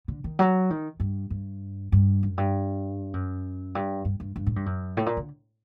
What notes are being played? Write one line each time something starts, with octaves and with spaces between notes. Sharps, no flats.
D3
D#3
F#3
D#3
G2
G2
G2
F#2
G2
F#2
G2
G2
G2
G2
A2
G2
F#2
A2
A#2
D3